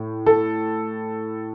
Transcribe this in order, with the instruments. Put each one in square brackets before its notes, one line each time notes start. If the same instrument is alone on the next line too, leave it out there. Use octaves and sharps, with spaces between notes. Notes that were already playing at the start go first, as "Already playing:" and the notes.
Already playing: [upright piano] A2
A4